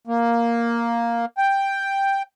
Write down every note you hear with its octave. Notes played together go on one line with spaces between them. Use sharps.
A#3
G5